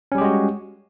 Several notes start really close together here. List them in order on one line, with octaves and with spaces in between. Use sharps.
C#4 G3 G4 G#3 F#4